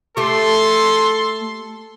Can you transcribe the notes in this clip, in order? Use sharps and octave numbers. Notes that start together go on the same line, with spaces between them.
A3 G4 A4 C6